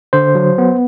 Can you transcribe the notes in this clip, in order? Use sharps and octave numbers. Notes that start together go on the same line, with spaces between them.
D3 C5
F#3
B3